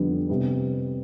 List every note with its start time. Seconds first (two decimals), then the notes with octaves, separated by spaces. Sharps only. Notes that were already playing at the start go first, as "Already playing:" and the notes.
Already playing: F2 D3 G3 B3 D4
0.29 C3 G3 B3